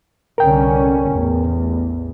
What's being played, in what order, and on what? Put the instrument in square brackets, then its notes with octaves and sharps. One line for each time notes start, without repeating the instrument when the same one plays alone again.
[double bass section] C2 D3 C#4 [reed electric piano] A#4 G5
[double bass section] A1 E2